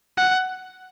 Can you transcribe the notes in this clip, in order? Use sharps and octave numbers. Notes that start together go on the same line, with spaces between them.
F#5